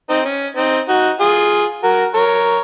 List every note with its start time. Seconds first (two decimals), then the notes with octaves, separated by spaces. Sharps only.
0.09 C4 D#4
0.25 C#4
0.56 C4 D#4
0.88 D#4 F#4
1.20 F4 G#4
1.83 F#4 A#4
2.14 A#4 C#5